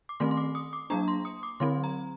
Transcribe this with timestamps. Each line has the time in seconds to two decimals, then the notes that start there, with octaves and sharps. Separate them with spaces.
0.09 D6
0.20 D#3 A3 C4 C6
0.31 C6
0.37 D6
0.55 D#6
0.73 D6
0.90 F#3 A#3 D4 A#5
1.08 C6
1.25 D#6
1.43 D6
1.60 D3 F#3 C4 C6
1.84 A#5